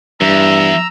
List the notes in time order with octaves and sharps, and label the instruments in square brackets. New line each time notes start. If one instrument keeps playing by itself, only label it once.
[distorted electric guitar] E2 [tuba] G2 [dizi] E5 [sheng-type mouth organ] A#5 E6